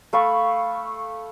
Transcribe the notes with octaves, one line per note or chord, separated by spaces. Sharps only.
A3 F5 B5 C#6